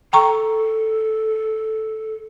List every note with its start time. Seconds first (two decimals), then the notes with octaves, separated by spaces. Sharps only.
0.13 A4 G5 A#5 C#6